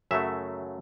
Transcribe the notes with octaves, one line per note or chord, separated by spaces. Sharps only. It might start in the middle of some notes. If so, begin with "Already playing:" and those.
F#2 C#3 F#3 A3 E5